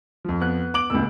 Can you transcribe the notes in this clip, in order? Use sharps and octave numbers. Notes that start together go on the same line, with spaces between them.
F2 F3
B3 F#6
D6 D7 F#7
D#1 C#2 E6